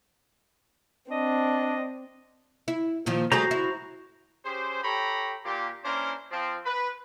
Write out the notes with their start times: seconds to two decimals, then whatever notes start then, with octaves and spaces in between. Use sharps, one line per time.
1.11 C4 D4 D#5
2.68 E4
3.06 A#2 D#3 F3
3.32 G3 A3 F#4 G#4 C5 A#5
3.51 E4
4.45 C#4 G4 G#4 C5
4.84 G4 A4 C#5 G5 A#5 B5
5.45 A#2 G4
5.85 A#3 C#4 D4 E4 A#4 C5
6.31 F3 C4
6.66 B4